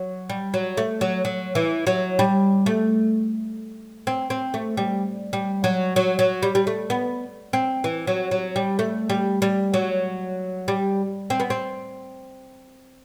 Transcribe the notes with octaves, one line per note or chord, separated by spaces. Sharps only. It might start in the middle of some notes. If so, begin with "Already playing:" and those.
Already playing: F#3
G3
F#3
A3
F#3
F#3
E3
F#3
G3
A3
C4
C4
A3
G3
G3
F#3
F#3
F#3
G3
G3
A3
B3
C4
E3
F#3
F#3
G3
A3
G3
G3
F#3
G3
C4
B3
C4